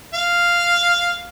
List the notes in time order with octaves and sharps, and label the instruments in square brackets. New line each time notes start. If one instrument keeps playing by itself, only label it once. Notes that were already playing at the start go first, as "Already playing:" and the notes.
[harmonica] F5